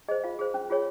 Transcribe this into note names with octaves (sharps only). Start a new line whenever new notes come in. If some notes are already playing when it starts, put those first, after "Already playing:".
G#4 C5 D#5
F4 F5
G#4 C5
C#4
F4 G#4 C#5